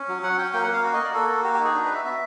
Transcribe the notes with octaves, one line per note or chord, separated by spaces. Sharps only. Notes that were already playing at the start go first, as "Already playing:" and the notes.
Already playing: C#4
F#3
F#3 F#5
C#4 G5
A#3 G5
F#5
A#3
F5
F#4
D#5
A#3
D5
F#4 A4
A#3
F#4 G4
G4
D#4
G#4
D4
B4
F#4 E5
B3 E5